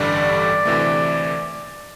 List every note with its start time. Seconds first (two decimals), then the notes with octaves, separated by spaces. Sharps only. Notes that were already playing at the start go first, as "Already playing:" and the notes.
Already playing: A1 G2 D3 G3 D5
0.65 D2 C3 E3 A3